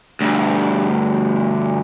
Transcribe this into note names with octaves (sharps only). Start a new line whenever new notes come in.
D2 G2